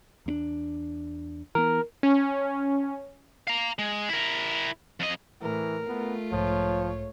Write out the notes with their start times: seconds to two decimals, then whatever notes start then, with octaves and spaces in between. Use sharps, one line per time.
0.26 E2 C4 D4
1.55 E3 B3 A#4
2.03 C#4
3.47 F5 A#5
3.79 G#3
4.09 E4 A#4
5.00 F2 D#5
5.42 A2 E3 A#4
5.87 A3 B3 F4
6.32 B1 G#2 F3 C#5